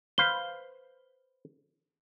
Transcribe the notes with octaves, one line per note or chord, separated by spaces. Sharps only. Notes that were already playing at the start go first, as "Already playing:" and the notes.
B4 C5 F5 G7